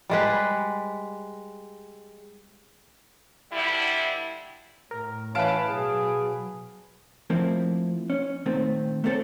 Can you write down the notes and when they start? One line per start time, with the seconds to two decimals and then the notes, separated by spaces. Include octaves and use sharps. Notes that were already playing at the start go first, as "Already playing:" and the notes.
0.10 G3 G#3 B4
3.52 G2 D3 G3 E4
4.91 A2 A#4
5.35 E3 C#4 B4 F5 A5 D7
5.68 B2 F#3 G#4
7.30 F3 A3 A#3 C4 E4
8.10 C#4
8.46 A#2 D#3 A3 C4
9.04 A3 A#3 C4 A4 C#5